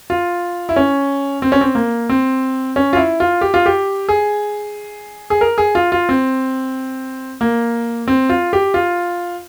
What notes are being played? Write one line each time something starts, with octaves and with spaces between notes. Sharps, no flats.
F4
E4
C#4
C4
C#4
C4
A#3
C4
C#4
F4
E4
F4
G4
F4
G4
G#4
G#4
A#4
G#4
F4
F4
C4
A#3
C4
F4
G4
F4